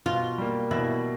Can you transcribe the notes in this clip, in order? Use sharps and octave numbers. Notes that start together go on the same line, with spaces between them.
B2 F4
G3 A#3
B2 E4